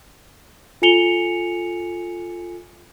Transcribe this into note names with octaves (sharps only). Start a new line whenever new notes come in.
F4 A4 G#5 C#7 F7 G7